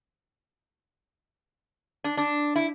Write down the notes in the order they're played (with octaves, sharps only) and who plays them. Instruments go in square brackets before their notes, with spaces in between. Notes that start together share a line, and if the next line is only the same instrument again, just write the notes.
[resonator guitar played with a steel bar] D4
D4
E4